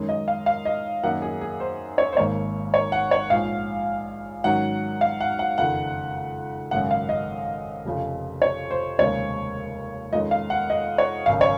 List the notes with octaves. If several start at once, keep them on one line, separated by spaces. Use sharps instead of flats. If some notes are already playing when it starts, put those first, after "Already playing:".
Already playing: F#2 D#3 G#3 C#4
D#5
F5
F5
D#5
F#2 D#3 A#3 F#5
G#4
G#4
C5
C#5
C5
G#1 G#2 D#3 A#3 C#5
C#5
F#5
C#5
A#1 G#2 F3 F5
G#2 D#3 F#3 C#4 F#5
F5
F#5
F#5
F#1 F2 D#3 F#5
G#1 F#2 C#3 G#3 F#5
F5
D#5
F1 F2 C#3
C#5
C5
F1 D#2 C#3 G#3 C#5
F2 D#3 G#3 C#4 D#5
F5
F#5
D#5
C#5
G#1 F#2 C#3 F5
C#5